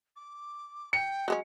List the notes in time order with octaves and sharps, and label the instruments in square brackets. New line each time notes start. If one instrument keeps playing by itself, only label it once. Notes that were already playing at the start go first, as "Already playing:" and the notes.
[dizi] D6
[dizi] G5 [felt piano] C#7
[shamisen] F#3 G#3 C#4